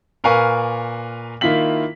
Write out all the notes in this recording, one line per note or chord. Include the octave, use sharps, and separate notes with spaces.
A#2 A#4 B4 F5 G#5 C#6
D#3 A#3 E4 F4 B6 F#7